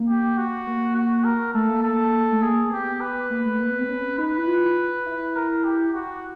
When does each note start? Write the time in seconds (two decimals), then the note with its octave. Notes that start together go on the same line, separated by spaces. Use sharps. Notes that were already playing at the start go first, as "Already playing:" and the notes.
Already playing: A#3
0.08 G4
0.37 F#4
0.67 A#3
0.96 F#4
1.24 A#4
1.54 A3 A4
1.69 A#3
1.83 A4
2.32 A3
2.42 A#3 G#4
2.71 B3 G4
3.00 B4
3.30 A#3
3.45 A3
3.59 A#3
3.69 B3
3.79 C4
3.89 C#4
4.18 D#4 B4
4.38 E4
4.47 F4
5.06 E4
5.36 A#4
5.64 G4
5.94 F#4